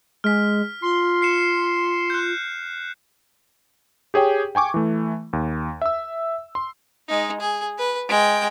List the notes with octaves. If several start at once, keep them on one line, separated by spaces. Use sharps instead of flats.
G#3 F6 B6
F4 C6
C7 C#7 E7
F#6 G6
G4 G#4 C#5 G5
G5 G#5 C#6 D6
E3 A3
D#2
E5 E6
C6
G#3 D#4
G#4
B4
G#3 G5